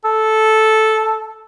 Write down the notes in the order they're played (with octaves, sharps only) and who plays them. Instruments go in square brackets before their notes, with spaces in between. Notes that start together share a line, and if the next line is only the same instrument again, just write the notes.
[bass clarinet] A4